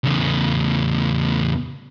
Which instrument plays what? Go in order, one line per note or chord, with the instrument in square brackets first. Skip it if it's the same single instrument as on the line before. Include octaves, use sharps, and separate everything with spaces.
[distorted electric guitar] E2 C#3